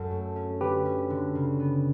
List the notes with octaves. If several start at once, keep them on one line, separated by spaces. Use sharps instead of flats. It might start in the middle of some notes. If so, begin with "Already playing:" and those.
Already playing: F#2 F#3 F#4 A4
A3
C#4
D3 G4 B4
C#4
D3
C#3
B3